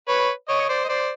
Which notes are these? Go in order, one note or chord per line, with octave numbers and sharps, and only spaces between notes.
B4 C#5
C#5 D#5
C5 D5
D#5
C5 D5